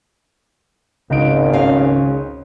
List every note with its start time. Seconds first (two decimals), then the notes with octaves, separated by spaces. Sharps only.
1.10 G#1 C#2 D#4 D7
1.53 C#3 C#4 F5